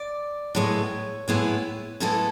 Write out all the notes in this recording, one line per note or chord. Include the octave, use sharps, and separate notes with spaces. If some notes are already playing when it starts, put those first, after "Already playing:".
Already playing: D5
A2 G#3 B3 E4 C#5
A2 G#3 B3 E4
A2 G#3 B3 E4 A4